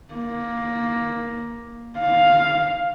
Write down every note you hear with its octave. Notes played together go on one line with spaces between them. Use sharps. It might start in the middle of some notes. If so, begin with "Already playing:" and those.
A#3
F5